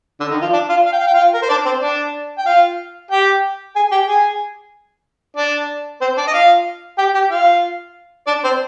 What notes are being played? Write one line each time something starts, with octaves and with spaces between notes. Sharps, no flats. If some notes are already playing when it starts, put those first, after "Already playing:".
D3 D4
D#3 D#4
F3 F4
D4 D5
F4 F5
F5
G5
F5
G5
F4 F5
A#4
C5
D4 D5
C4 C5
D4 D5
G5
F4 F5
G4 G5
G#4 G#5
G4 G5
G#4 G#5
D4 D5
C4 C5
D4 D5
D#5
F4 F5
G4 G5
G4 G5
F4 F5
D4 D5
C4 C5